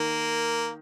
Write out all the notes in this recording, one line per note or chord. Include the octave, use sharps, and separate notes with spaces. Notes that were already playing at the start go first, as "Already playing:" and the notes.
Already playing: D#3 A#3